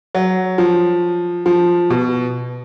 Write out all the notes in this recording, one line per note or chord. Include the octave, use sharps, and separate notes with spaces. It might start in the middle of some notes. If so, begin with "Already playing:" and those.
F#3
F3
F3
B2